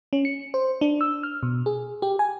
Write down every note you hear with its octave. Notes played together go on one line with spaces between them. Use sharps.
C#4
C#7
C5
D4
E6
F6
B2
G#4
G4
G#5